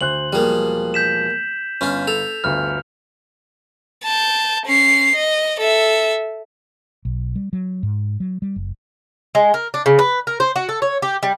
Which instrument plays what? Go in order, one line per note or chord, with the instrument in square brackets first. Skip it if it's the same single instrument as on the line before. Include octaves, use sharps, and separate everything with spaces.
[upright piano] D2 C5 F#6 [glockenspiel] F#7
[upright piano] E1 F3 G#4 [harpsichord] G3 A#3
[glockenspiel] G6 B6 E7
[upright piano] G1 [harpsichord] C#4 F4
[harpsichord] A4 [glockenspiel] F7
[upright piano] G1 D2 [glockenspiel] F6
[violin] A5 G6
C#4 C7
D#5
A4 E5
[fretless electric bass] B1
G3
F#3
G#2
F#3
G3
F#1
[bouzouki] G#3
A#4
D4
C#3
B4
A#4
C5
F#4
A4
C#5
G4
G3